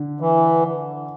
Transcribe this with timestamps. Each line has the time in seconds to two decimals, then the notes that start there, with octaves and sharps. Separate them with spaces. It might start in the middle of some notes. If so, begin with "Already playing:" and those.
Already playing: D3
0.20 E3